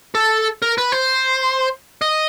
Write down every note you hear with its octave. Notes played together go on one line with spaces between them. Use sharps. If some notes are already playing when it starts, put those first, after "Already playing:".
A4
A#4
B4
C5
D#5